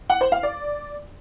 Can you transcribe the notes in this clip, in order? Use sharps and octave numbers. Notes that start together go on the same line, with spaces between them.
F#5
C5
F5
D5